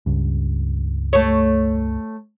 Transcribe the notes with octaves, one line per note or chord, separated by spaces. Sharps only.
C#2 G2
A3 C#5